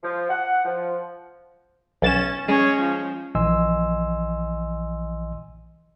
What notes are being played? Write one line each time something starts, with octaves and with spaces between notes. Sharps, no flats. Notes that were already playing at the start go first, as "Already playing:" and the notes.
F3
F#5
F3
B1 C#4 A6 E7
G#3 C#4 C#5
F3
A#1 E3 D#5 G#5 C6 E6